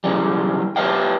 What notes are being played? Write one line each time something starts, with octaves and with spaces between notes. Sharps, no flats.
B1 C#3 E3 G3
G4 B4 C#5 E5 F5 G5